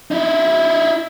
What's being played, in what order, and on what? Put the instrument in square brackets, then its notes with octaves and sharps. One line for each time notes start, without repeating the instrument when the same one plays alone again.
[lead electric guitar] D#4 E4